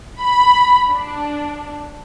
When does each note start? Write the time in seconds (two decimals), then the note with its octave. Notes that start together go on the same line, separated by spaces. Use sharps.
0.20 B5
0.90 D4